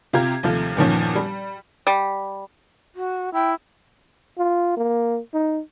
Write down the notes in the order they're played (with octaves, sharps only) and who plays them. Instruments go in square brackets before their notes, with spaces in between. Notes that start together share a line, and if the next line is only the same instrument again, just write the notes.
[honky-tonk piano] C3 F4 G4 A#5 G#6
D#2 C3 F3 A3 F4
E2 G2 A#2 D#3 F3 C#4
G3
[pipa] G3
[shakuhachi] F#4
[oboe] E4 [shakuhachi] G5
[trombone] F4
A#3
D#4